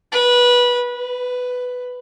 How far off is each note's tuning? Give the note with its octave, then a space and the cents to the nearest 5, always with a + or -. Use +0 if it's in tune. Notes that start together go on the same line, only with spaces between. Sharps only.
B4 -20
B4 +10